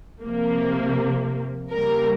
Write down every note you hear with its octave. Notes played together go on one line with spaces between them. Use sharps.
C3 F3 A#3
C#3 G3 A#3 A#4